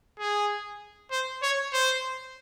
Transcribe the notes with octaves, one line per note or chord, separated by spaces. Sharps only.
G#4
C5
C#5
C5